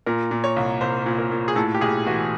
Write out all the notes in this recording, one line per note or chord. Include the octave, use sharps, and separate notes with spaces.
A#2 A#4
A#2
C#5
C2
C2 C5
A#2
A#4
A#2
G#4
A2 A4
G4
B1 G#4
E3 F#4